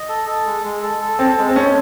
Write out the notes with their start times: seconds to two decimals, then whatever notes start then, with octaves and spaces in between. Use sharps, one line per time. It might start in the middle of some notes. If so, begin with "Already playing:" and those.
Already playing: D#5
0.09 A4
0.27 A4
0.46 G#3
0.64 G#3
0.82 A4
1.01 A4
1.19 C4 A4
1.38 G#3
1.49 C4
1.56 C#4 A4